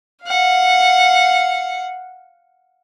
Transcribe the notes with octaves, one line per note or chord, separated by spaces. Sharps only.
F5 F#5